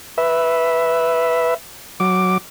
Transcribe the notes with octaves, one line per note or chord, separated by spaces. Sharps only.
B4 E5
F#3 D6